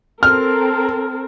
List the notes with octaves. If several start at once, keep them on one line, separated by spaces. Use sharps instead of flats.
C4 A4 A#4 F6